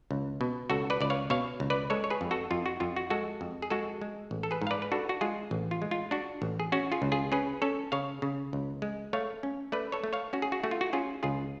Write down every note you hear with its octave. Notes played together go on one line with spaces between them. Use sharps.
C#2
B2
C#2 F#4 A4
B4 D5
C#2 D5
C#5 F5
B2 C#5 F5
C#2
B4 D5
G#3 A4 C#5
C#5
G#4 B4
F2
F#4 A4
F2 F4
F#4
F2 F4
F#4
G#3 F#4 A4
F2
G#4
G#3 F#4 A4
G#3
A1
A4
G#4 B4
G#2
F5
B4 D5
B4
D4 F#4 A4
F#4
G#3 F4 G#4
A1
F4
G#3
F4
D4 F#4
A1
G#4
C#4 F#4
F4 G#4
C#2
F4 G#4
C#4 G#4 B4
C#4 A4 C#5
C#3 C#5 F5
C#3
C#2
G#3
A3 C#5 F5
C#4
A3 B4 D5
A4 C#5
A3
C#5 F5
C#4 F#4
G#4
F#4
A3 F#4
F4
F#4
C#4 F4 G#4
C#2 F4 G#4